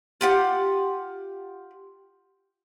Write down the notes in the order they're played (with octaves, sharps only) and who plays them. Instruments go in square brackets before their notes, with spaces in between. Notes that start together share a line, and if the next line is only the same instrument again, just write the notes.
[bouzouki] F4 G4 F#5